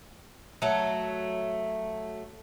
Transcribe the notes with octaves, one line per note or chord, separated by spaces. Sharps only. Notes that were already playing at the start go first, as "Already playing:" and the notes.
F#3 A3